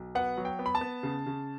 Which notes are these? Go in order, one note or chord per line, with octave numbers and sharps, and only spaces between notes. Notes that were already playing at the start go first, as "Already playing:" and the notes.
Already playing: B1
B3 F#5
F#3
G5
B3
B5
A5
B3
C#3
C#3